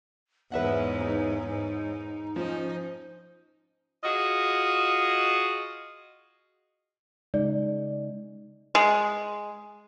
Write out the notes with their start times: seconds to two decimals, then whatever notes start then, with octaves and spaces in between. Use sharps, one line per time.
0.52 E2 G#2 B4 C#5 E5 F#5
1.01 D#4
1.47 G#2
2.36 F3 C#4 D#4 C5
4.04 F4 F#4 G#4 D#5
7.34 C#3 G#3 D#4 D5
8.75 G#3